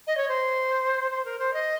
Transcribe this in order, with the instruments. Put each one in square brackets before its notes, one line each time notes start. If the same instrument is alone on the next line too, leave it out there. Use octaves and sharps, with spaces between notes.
[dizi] D#5
C#5
C5
C5
A#4
C5
D#5